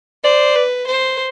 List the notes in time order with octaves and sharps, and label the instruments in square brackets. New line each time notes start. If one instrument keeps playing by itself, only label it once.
[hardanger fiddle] C5 [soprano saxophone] D5
[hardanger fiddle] B4
C5